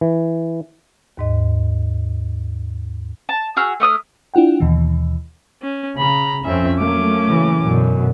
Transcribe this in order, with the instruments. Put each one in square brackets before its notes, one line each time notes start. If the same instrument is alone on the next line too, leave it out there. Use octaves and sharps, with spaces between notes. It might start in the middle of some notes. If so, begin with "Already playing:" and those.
[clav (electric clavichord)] E3
[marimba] D#2 G#2 D#5
[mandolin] A5
F#4 G#4 E6 F6
A3 E4 D#6 F6
[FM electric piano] D4 E4 F4 F#5 G5
D#2 B2 E3
[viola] C#4
[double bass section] C#3 [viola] A#5 B5
[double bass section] F2 C#4 [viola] C4 E5
[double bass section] F#3 A3 A#3 [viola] C#4 D6
[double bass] C#3 E3
[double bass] F#2 B2 [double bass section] D3